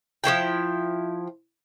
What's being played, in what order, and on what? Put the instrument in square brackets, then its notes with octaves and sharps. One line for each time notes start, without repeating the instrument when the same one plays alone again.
[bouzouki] F3 A#3 E4 G5